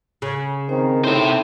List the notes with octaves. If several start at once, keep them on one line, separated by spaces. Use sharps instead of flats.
C#3
D#3 C4 C5
A2 C3 D#4 C5 E5